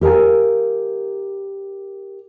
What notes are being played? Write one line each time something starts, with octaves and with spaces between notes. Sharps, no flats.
G4 A#4 F5 G#5